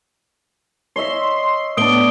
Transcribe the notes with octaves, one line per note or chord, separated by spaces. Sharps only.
C#5 D#5 E5 C6
A2 B3 D4 D#6 D7 G7